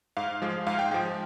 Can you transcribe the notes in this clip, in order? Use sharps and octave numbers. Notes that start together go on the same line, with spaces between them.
G#2 F5
F3 G#3
G#2 F5
G5
F3 G#3 G5